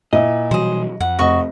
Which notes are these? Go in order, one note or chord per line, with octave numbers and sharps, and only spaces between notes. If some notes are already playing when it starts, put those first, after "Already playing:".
A#2 E4 D#5
B2 E3 F#3 G3 G#4 C5
F2 F#5
F1 F#4 D#5 C#6